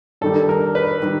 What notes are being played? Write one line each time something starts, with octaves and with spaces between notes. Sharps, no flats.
G2 D#3 G3 A4
A#4
B4
D#3 G3